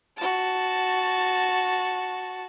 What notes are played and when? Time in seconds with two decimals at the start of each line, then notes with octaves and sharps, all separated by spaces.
0.17 F#4 A5